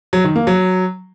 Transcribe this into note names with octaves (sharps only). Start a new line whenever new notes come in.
F#3
D#3
A#3
F#3